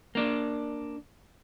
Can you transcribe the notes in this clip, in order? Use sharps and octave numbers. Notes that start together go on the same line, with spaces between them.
A#3 D4